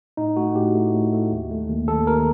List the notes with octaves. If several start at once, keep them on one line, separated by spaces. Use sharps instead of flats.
A2 D#4
A3 F#4
A2 G4
A3
A2
A3
D#2
A3
D#2
D#2 A4
D#2 A#4